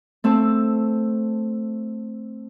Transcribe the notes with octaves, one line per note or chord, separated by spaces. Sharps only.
A3 C4 A4